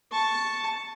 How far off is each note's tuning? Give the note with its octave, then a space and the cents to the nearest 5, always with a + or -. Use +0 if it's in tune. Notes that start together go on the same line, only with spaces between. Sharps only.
A5 +0 C#6 +0